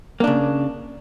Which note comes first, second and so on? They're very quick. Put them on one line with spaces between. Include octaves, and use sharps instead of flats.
A#3 D4 C#3